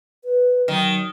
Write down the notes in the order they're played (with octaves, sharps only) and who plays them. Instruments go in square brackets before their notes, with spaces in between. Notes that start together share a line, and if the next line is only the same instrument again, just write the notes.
[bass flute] B4
[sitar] D#3 [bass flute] F#3